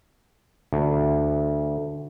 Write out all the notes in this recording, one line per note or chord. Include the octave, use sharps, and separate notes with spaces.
D2